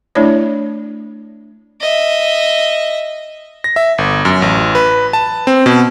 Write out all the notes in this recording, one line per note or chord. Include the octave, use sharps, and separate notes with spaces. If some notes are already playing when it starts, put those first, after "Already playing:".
A3 D4 E4 C#5 D5
D#5 E5
A#6
E5
G1
F#2
A1
B4
A5
C4
B2